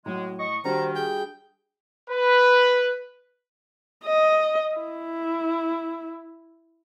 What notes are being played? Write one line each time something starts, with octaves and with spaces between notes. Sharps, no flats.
A2 F#3 G#3
D#5 C#6
D#3 G3 D4 F#4 C5 A#5
G#4 G5
B4
D#5
E4